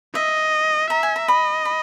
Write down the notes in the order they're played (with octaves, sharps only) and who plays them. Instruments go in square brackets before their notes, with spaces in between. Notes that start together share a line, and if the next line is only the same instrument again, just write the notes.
[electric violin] D#5 [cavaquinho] E5
[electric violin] E5 [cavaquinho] A#5
[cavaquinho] G#5
A#5
[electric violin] D#5 [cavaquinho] B5
[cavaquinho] B5